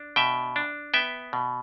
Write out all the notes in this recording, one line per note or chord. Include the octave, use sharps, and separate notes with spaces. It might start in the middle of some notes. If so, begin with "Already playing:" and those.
Already playing: D4
B2 E5 G5
D4
B3 E5 G5
B2